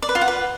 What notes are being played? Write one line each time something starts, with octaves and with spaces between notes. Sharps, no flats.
D5
B4
F4
F#5
B4